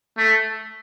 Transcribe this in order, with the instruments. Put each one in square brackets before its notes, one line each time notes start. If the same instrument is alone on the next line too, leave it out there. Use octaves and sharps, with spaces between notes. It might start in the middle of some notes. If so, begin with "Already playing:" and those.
[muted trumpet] A3